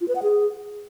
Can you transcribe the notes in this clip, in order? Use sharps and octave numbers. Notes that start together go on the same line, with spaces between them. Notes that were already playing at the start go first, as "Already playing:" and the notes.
F4
B4
F#5
G#4